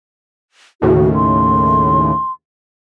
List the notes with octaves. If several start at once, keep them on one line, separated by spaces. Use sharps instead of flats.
D#2 A2 C#3 F#4
C6